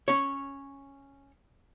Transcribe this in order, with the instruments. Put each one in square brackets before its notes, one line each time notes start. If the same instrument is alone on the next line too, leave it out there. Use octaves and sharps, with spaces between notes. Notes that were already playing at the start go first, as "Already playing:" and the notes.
[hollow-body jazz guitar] C#4 C#5